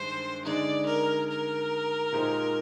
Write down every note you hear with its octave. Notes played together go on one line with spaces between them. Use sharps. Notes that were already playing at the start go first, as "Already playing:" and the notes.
Already playing: G2 D#3 G#3 C5
D3 G#3 D#4 D5
A#4
A#4
A#2 G#3 D#4 G4 C5